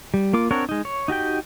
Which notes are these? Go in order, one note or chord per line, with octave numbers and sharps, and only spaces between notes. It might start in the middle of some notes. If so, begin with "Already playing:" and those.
G3
A#3 F4 D6
C4 D4 A#4 C#5 F#5
G#3 D#4
C#5
D#4 F#4 G4 G5